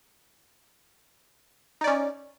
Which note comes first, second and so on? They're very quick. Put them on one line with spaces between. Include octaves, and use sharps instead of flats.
D#4 D5 C#4